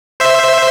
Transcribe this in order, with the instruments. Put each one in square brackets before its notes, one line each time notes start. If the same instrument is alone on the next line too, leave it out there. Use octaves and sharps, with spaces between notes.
[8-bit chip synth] C5 E5